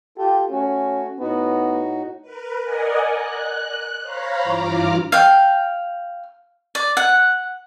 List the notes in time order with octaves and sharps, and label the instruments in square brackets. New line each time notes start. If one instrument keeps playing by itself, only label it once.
[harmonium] F4 A4 [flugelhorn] G4
[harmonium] A3 F#4 [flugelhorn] C#4
[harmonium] A2 D#4 F#4 [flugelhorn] B3
[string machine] A#4 B4
A#4 D5 D#5 F#5 G#5
F#6
C5 C#5 F5 A#5 B5
G2 E3 F4 A#5 D6 F6
[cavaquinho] F5 G5
D5
F#5